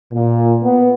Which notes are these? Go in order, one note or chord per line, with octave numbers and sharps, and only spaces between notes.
A#2
B3